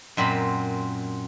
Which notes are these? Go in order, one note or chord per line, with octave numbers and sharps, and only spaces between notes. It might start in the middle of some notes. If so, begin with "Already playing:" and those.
F#2 A#2 C4 B5